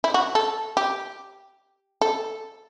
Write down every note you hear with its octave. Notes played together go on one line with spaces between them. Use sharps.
E4
F#4
A4
G4
A4